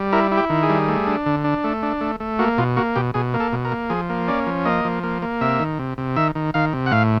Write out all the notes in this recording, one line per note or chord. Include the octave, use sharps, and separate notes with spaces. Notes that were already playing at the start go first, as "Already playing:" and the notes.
Already playing: G3
E4 A#4
E4
G4
D#3
G#4
G3
A3
D4
D3
D4
A3
D4
A3
A3
A#3 F#4
B2 F4
A#3 F#4
B2 G4
B2 G#4
A#3
A4
B2
A#4
A#3
F3 G#4
A#3
C#4 D5
F3
A#3 D#5
F3
A#3
A#3
C3 E5
D#3
C3
C3
D#3 E5
D#3
D#3 F5
C3
F#5
A2 F5